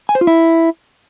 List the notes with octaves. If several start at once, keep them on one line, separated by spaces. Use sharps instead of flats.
G#5
C5
F4
E4